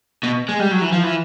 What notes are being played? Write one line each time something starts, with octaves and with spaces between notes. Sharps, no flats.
B2
G#3
G3
F#3
E3
F3
E3